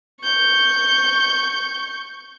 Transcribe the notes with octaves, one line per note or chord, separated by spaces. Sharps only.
C#6 G6